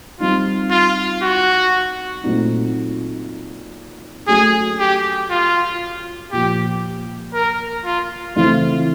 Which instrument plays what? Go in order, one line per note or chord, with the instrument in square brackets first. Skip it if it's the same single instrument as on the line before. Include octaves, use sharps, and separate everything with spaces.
[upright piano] G3 C4 D#4 [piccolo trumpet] F4
[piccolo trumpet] F4
F#4
[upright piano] A#2 F#3 A3 C4 D#4
[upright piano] F#3 A3 C#4 F#4 [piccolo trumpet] G#4
[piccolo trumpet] G4
F4
[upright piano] A#2 F3 A#3 [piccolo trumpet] G4
[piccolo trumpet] A#4
F4
[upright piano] C#3 E3 A3 C4 E4 [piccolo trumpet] F4